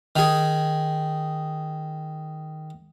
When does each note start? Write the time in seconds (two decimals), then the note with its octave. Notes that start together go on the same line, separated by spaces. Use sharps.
0.16 D#3 G#4